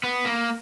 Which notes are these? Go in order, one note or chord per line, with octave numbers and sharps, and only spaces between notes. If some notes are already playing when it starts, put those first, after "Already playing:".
B3
A#3